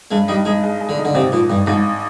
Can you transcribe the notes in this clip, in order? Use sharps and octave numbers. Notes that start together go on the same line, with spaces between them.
G2 G#3
G3 D#4
G#3 D#4
G#3
G#3
D3
D#4
D3
G#1 C3
G#1 A#2
G#1 G2
G#1 G#2